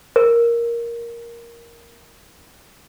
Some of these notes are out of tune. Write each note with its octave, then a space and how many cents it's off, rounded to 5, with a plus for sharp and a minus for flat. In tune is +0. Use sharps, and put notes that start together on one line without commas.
A#4 +5